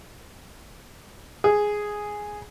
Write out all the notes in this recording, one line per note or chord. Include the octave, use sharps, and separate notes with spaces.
G#4